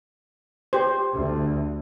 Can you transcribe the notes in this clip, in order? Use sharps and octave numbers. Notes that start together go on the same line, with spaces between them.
G4 C5
D2